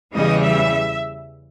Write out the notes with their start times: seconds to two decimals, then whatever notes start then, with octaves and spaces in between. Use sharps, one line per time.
0.13 E2 C#3 E3 G3 D#5
0.42 E5